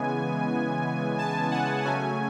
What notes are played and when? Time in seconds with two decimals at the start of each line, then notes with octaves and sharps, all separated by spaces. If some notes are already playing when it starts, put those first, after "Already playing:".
Already playing: C#3 E3 G#3 B3 G#5
1.18 A5
1.51 F#5
1.85 C#3 F#3 A3 C#4 G#5